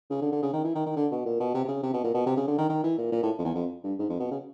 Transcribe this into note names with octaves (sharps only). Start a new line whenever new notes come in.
C#3
D3
D3
C#3
D#3
E3
D#3
D#3
D3
B2
A#2
B2
C3
C3
C#3
C3
B2
A#2
B2
C3
C#3
D3
D#3
D#3
E3
A#2
A#2
A2
F2
E2
F2
G2
G#2
F2
B2
C#3